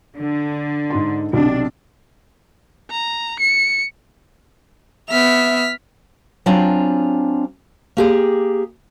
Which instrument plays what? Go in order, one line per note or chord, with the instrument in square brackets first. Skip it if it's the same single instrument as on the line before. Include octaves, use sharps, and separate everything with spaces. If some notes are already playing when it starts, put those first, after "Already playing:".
[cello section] D3
[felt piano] G#2 D#4 C6
[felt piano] B1 C3 [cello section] D4
[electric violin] A#5
C#7
[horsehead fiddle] B3 E5 [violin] F6 B6
[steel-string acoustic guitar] F#3 C4 D4 F4 G#5
A#3 G4 G#4